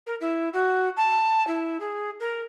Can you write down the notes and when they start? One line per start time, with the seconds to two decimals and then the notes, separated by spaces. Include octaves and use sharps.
0.07 A#4
0.20 E4
0.53 F#4
0.97 A5
1.47 E4
1.80 G#4
2.20 A#4